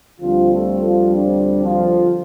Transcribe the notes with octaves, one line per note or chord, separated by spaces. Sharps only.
D2 D3 F3 G3 C4 F4
A3 A4
F3 F4
D4
F3 F4